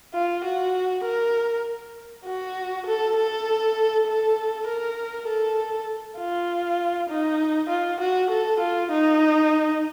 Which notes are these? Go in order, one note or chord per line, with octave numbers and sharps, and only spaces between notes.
F4
F#4
A#4
F#4
A4
A4
A4
A#4
A4
F4
D#4
F4
F#4
A4
F4
D#4